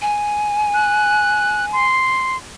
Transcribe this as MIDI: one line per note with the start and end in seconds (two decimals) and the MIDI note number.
0.02 1.85 80
0.74 1.66 90
1.73 2.37 84